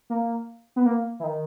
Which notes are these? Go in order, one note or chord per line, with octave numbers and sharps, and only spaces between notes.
A#3
B3
A#3
E3
D#3